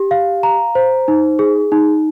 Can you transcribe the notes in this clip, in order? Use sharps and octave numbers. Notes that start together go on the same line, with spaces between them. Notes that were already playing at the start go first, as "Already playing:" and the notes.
Already playing: G4
F5
A#5
C5
D#4
G#4
D#4